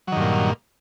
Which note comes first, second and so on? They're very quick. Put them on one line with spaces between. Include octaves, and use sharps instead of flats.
F#3 D#3 G2 A#2